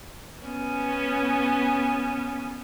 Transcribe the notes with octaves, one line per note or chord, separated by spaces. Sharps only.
B3 C#4